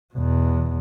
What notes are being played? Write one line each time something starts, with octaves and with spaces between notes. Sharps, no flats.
E2 B2